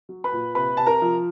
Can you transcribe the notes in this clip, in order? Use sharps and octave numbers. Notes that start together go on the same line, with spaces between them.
F#3
B4 B5
A#2
C3 B4 B5
C3 A5
A#4 A#5
F3